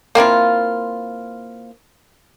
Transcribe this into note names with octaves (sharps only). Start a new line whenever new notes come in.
A#3 C4 E4 F4